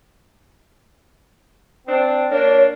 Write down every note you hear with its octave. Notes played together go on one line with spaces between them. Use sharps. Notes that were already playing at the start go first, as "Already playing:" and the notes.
C4 D4
A#3 D4 C#5